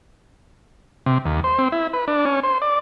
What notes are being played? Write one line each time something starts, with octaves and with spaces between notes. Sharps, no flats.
C3
D#2
C5
C4
E4
B4
D4
C#4
C5
D5